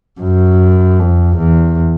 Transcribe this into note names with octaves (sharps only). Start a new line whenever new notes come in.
F#2
F2
E2